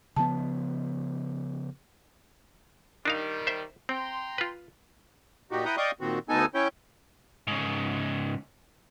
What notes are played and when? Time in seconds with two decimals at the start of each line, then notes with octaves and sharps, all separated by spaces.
0.16 C#3 F3 B3 A5
3.05 D#3 G3 D4 D#4 F5
3.47 C5 E5
3.89 C4 G5 A#5 C6
4.38 F4 B4
5.51 A#2 D#4 F#4 G4
5.65 E4 B4 F#5 G5 A#5 D#6
5.77 D5 D#5 F5 G5 C#6 D#6
6.00 A#2 D#3 C4 F#4
6.29 D2 B3 D#4 A4 G#5
6.55 C#4 E4 C#5 G5
7.47 G#2 C#3